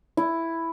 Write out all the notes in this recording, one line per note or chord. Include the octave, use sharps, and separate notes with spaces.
E4